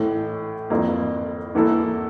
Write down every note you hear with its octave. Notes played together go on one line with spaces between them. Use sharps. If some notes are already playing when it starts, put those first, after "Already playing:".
Already playing: A1 A2 E3 A3
G1 F2 E3 A#3 F4
E2 E3 A#3 E4 A4